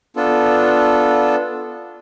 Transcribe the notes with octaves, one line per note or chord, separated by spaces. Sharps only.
B3 D4 F4 A4